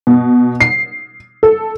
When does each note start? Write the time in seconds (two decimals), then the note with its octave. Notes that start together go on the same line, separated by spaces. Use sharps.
0.07 B2
0.60 C7
1.43 A4